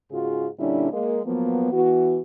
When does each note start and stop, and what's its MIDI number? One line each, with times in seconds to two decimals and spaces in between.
0.12 0.48 44
0.12 0.48 49
0.12 0.48 65
0.12 0.48 66
0.12 0.48 68
0.59 0.89 46
0.59 0.89 50
0.59 0.89 55
0.59 0.89 61
0.59 0.89 62
0.59 0.89 64
0.93 1.19 56
0.93 1.19 58
1.26 1.70 53
1.26 1.70 54
1.26 1.70 58
1.26 1.70 59
1.72 2.20 52
1.72 2.20 59
1.72 2.20 66